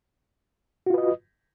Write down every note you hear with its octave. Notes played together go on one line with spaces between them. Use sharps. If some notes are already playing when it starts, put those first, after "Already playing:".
F4 F#4 B4 D#5